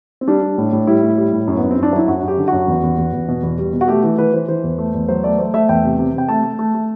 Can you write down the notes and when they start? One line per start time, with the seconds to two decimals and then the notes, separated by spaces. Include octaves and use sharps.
0.21 C4
0.28 G3 D4
0.43 G3
0.58 A2
0.73 A2
0.87 G3 E4
1.03 A2
1.18 G3
1.33 A2
1.48 F#2
1.58 B3
1.63 F#2
1.71 C4
1.78 F#2 D4
1.93 F#3 E4
2.08 F#2 F#4
2.23 F#2
2.28 G4
2.38 D3
2.48 F#4
2.53 F#2
2.68 E2
2.83 E2
2.98 E2
3.13 E2
3.29 B2
3.43 E2
3.58 G3
3.73 B2
3.81 F#4
3.88 A3 G4
4.04 E3
4.18 E3 B4
4.33 E3 C5
4.48 E3 C5
4.64 E2
4.79 A3
4.94 E2
5.08 F#3 C5
5.24 A3 D5
5.39 A3 C5
5.54 A3 E5
5.69 E2 G5
5.84 C3
5.99 C3
6.14 C3 G5
6.28 A3 A5
6.44 A3
6.59 A3
6.75 A3